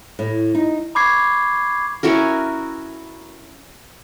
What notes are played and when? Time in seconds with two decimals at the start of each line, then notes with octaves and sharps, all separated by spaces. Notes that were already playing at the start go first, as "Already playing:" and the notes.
0.19 A2
0.55 D#4
0.95 B5 C#6 D6 G#6 C7
2.03 C#4 E4 F#4 A#4